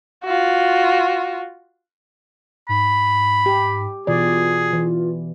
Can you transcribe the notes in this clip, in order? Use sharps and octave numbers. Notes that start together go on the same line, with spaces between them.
F4 F#4
G#2 B5
G4
B2 E3 F4 G#4 D5
E3